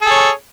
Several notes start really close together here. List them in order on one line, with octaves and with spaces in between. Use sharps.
A4 G#4 C#5